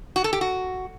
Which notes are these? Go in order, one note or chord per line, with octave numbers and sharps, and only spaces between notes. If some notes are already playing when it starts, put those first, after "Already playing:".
F#4
A4
G4
F#4